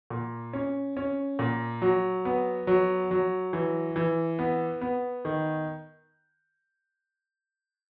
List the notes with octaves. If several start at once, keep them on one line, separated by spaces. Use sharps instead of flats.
A#2
C#4
C#4
A#2
F#3
B3
F#3
F#3
E3
E3
B3
B3
D#3